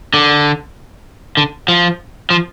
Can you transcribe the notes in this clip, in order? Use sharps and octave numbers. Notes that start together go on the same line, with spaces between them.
D3
D3
F3
F3